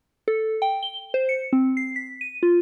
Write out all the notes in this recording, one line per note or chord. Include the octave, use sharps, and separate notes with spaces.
A4
G5
G7
C5
C#7
C4
C7
B6
D#7
F4